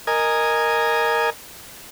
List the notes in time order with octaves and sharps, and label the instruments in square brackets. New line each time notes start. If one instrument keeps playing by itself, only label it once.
[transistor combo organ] A#4 D#5 G#5